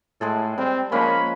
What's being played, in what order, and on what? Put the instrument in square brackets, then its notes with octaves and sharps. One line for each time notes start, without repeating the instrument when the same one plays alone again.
[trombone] A2 [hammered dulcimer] G#3 G#4 A4
[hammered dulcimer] G3 [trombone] C4
[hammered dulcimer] F3 G#3 C#4 [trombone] A#3 [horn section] A#4 C#5 B5